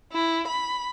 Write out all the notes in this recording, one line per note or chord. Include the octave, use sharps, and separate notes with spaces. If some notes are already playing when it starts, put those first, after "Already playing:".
E4
B5